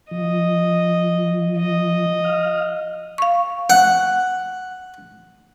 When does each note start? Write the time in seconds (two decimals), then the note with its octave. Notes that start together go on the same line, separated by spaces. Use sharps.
0.11 F3 D#5
1.58 D#5
2.24 F5
3.18 F5 C#6
3.70 F#5